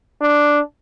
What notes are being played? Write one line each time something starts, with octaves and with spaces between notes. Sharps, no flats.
D4